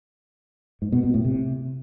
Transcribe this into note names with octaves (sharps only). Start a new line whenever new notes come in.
G#2
B2
B2
A2
C3